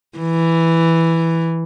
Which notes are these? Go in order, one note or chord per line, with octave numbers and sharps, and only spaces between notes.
E3